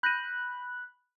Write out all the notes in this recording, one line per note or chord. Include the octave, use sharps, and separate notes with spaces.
B5 F#6 G6 A#6 D#7